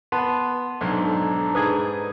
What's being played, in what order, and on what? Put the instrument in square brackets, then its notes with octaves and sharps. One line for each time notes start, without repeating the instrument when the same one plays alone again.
[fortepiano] B3 [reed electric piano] F#5 A5 C6
[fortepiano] B1 G#2 [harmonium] D4 D#4 A4
[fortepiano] G#2 G#4 [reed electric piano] B4 D#6 G#6